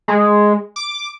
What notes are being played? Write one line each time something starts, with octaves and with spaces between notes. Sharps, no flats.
G#3
D6